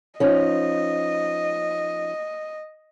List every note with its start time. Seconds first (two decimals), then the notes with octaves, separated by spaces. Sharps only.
0.20 F3 C#4 D#4 D#5